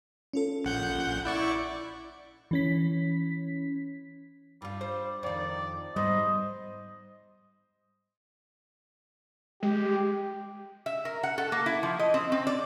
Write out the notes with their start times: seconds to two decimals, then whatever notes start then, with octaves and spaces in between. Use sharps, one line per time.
0.33 C#4 F4 A4
0.65 A#1 F#5 G6
1.25 E4 D5 C#6
2.51 E3 C#4 B6
4.62 G2 G3 F4
4.81 C5
5.23 F2 D#3 D5
5.96 G#2 G3 B3 C5 D#5
9.63 G#3 G4
10.86 E5
11.05 A#4
11.23 F#5
11.38 A4
11.52 A#3
11.66 E4
11.83 F3
11.99 D#5
12.14 C4
12.32 C4
12.47 D5